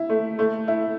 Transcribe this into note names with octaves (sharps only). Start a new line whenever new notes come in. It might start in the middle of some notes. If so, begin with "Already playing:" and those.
Already playing: E4
A3
A3
E4